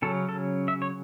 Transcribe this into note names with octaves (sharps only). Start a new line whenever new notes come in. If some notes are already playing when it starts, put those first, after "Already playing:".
C#3 F#3 C#4 A4
A4
E5
C#5